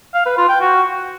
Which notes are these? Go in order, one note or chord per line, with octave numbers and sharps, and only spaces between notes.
F5
B4
F4
G5
F#4